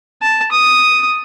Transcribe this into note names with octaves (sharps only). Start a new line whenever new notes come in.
A5
D#6